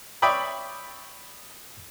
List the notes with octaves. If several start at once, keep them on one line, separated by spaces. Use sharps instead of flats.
C#5 D5 E5 G5 B5 D#6